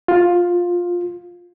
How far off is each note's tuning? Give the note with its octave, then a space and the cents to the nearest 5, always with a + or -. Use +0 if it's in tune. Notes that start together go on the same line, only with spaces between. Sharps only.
F4 +10